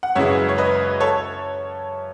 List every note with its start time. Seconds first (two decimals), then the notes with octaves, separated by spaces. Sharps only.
0.03 F#5
0.15 F#2 C#3 E3 G#3 C#5 E5
0.49 C#5
0.58 B4 D#5
1.01 A4 C#5